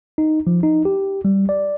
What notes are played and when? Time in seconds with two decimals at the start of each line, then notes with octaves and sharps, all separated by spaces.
0.18 D#4
0.47 F3
0.63 D#4
0.85 G4
1.25 G3
1.49 D5